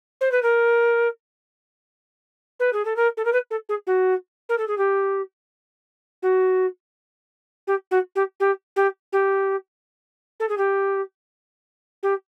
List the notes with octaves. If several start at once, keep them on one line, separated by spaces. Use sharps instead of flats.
C5
B4
A#4
B4
G#4
A4
A#4
A4
A#4
B4
A4
G#4
F#4
A#4
A4
G#4
G4
F#4
G4
F#4
G4
G4
G4
G4
A4
G#4
G4
G4